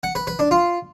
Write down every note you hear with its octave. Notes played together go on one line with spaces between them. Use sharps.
F#5
B4
B4
D4
F4